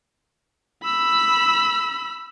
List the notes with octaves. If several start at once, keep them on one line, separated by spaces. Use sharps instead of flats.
B5 E6